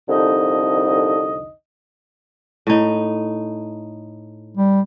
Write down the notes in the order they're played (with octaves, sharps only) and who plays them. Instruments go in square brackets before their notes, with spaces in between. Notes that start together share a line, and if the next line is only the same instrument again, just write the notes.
[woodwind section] C2 F2 D3 D#4 D#5
[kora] A2 D#4
[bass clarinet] G3